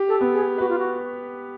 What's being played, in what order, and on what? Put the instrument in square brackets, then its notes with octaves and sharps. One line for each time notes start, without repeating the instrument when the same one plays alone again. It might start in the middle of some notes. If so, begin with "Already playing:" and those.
Already playing: [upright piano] G4
[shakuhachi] A4
[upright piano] B3
[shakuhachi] G#4
[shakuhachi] F#4 [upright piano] B4
[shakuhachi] F4
F#4